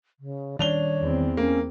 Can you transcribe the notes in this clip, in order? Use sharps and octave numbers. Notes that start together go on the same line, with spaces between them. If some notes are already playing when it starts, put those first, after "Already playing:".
C#3
D#3 G3 C#4 D4 C#5 F7 G7
E2 C4
A#3 C#4